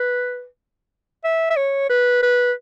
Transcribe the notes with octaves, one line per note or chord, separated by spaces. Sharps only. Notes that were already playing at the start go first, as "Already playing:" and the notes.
Already playing: B4
E5
E5
C#5
B4
B4